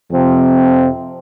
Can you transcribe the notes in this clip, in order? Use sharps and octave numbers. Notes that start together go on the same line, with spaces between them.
F2 C3 F3 C4